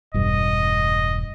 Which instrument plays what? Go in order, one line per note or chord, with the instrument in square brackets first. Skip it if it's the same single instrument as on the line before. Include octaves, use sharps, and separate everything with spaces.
[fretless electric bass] E1 G2 [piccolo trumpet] D#5